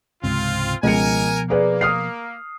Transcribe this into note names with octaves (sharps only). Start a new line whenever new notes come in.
C#2 G#2 C3 C4 F4
C#2 B2 F3 B3 A#4 G#5 C#7
A#3 G#4 B4 D5
D#6 F6 C7